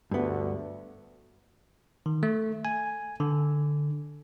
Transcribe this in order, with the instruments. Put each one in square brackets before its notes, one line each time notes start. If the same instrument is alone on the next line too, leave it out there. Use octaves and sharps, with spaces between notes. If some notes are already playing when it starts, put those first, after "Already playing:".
[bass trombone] D2 [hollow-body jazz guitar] G2 B3
[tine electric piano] D#3
A3
G#5
D3